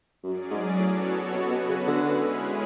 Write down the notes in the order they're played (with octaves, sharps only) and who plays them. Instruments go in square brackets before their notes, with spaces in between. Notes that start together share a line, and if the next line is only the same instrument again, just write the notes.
[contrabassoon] F#2 [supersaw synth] F#3 C#4 G#4 D5
[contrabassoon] G#2
[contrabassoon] A2 [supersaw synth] B3 F#4 A4 C#5
[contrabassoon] B2 [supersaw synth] B3 F#4 B4
[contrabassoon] B2
C#3
[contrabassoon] D3 [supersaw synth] G#3 C#4 E4 G#4 B4